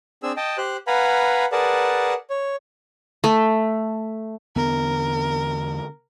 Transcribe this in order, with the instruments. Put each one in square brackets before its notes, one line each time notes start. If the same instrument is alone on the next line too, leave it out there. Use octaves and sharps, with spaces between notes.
[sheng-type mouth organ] C4 D4 G#4 E6
D#5 G5 A5
G4 C5 F#6
B4 F5 F#5 G#5 A#5 B5
G#4 A#4 B4 D5 F#5 A5
C#5
[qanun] A3
[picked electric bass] E2 D3 B3 [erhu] A#4